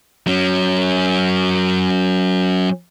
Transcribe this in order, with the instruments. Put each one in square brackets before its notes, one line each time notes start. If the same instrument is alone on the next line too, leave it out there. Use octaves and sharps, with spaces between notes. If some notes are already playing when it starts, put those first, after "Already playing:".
[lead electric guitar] F#3 C#4